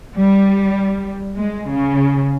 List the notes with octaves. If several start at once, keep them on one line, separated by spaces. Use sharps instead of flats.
G3
G#3
C#3